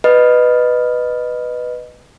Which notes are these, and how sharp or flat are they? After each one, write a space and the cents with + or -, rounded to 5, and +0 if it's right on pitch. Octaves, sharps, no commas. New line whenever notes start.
B4 +0 D#5 -15